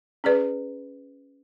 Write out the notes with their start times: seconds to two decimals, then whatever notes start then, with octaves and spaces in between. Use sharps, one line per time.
0.24 C#4 G#4 B4 D5